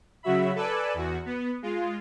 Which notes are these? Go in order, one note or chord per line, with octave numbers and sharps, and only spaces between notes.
C#3 F#3 F#4 E5 B5
A4 B4 D5 G#5 E6 F#6
E2 F#4
B3
G#3 F4